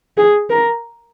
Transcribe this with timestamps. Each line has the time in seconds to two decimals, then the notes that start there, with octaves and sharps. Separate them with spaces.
0.17 G#4
0.50 A#4